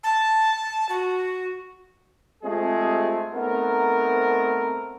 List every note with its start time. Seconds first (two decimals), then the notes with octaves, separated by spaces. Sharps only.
0.03 A5
0.89 F#4
2.43 G#3 A3 C4 F4 G4 G#4
3.34 A3 B3 C4 D#4 A#4